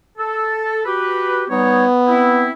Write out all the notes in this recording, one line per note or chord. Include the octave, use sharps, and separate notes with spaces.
A4
F#4 G4 B4
G3 B3 D#4 C#5
C4 E4